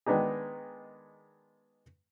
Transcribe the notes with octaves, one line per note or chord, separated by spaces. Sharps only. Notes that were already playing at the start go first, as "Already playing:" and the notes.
D#3 G#3 B3 D4 D#4 G#4